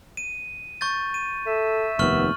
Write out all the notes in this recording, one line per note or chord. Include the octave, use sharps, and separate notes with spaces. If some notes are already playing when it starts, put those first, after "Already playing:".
D#7
C#6 G6 A6
D#7
A4 E5
F1 D#2 B3 C#6 F6 F#7